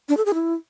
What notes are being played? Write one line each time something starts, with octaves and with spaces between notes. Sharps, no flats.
D4
A4
G#4
E4